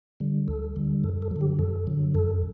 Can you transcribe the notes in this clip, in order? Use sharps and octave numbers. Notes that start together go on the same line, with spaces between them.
D3 G3
D2 A4
D3 G3
F#2 A4
A4
D3 F#3
G4
F#2 A4
D3 F#3
F#2 A4